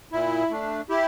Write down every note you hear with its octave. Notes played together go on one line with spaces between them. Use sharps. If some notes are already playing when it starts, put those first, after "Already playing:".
A#2 E4
A3 D4
E4 G4